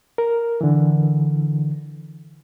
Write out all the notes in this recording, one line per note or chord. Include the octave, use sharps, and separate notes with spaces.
A#4
D3 E3